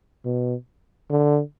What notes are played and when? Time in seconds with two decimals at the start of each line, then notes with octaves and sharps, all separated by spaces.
0.25 B2
1.10 D3